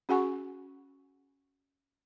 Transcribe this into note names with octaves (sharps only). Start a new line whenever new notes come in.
C#4 F#4 G#4 F#5 G#5 C#6